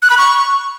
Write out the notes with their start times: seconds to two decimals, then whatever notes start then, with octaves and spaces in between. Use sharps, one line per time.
0.02 F#6
0.10 B5
0.18 C#6